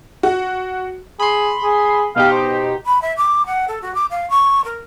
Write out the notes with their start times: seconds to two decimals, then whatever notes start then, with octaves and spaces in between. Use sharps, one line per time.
0.23 F#4
1.20 G#4 B5 C6
1.63 G#4
2.16 B2 D#4 G4 F5
2.32 C5
2.86 B5
3.02 E5
3.17 D6
3.46 F#5
3.68 A4
3.82 F#4
3.95 D6
4.10 F5
4.30 C#6
4.65 A#4